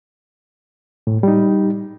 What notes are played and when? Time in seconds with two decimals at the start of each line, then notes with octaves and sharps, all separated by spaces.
1.07 A2
1.23 G3 D#4